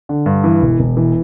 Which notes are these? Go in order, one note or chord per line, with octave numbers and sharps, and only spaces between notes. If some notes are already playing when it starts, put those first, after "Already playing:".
D3
G2
E3
E1
E1
E3